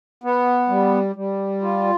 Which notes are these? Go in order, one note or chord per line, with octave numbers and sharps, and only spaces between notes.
B3
G3
G3
F4